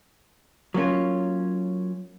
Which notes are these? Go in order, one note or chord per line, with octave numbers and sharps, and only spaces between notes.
F#3 A#3 C#4 F4